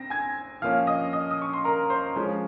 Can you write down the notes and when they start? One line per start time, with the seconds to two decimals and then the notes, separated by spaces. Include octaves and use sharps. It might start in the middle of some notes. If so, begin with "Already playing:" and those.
Already playing: C4 A#6
0.10 G#5 G#6
0.62 F3 A#3 C#4 F5 F6
0.87 D#5 D#6
1.13 D#5 D#6
1.31 D#6
1.42 C#6
1.53 C6
1.64 A#4 A#5
1.90 C5 C6
2.16 F3 G#3 C#4